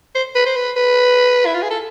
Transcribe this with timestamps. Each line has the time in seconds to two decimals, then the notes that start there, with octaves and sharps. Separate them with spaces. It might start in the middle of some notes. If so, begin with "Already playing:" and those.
0.15 C5
0.35 B4
0.46 C5
0.56 B4
0.76 B4
1.46 E4
1.54 F4
1.62 G#4
1.70 A4